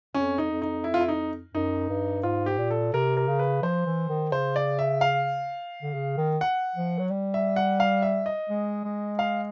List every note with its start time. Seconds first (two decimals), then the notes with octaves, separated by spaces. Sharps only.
0.15 F2 C#4
0.38 D#4
0.50 F2
0.62 D#4
0.84 E4
0.94 F4
1.01 E4
1.08 D#4
1.54 F#2 D#4
1.89 G2
2.23 G#2 F4
2.46 G4
2.58 A#2
2.71 A4
2.93 C3 A#4
3.17 A#4
3.27 C#3
3.39 B4
3.63 F3 C5
3.86 E3
4.09 D#3
4.32 C#3 C5
4.56 D5
4.79 E5
5.01 F5
5.82 D3
5.94 C#3
6.17 D#3
6.41 F#5
6.76 F3
6.99 F#3
7.11 G3
7.34 E5
7.56 F#5
7.80 F5
8.02 E5
8.26 D#5
8.50 G#3
8.84 G#3
9.19 F5